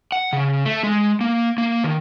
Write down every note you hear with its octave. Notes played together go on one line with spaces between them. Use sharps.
F#5
C#3
A3
G#3
A#3
A#3
D#3